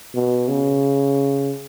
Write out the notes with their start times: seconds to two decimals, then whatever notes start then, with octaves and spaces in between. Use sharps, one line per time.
0.14 B2
0.48 C#3